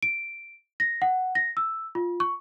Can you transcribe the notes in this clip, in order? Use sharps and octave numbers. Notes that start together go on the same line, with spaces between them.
D7
A#6
F#5
A#6
E6
F4
C#6